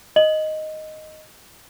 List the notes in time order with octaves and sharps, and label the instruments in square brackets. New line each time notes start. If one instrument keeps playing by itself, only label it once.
[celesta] D#5 F#7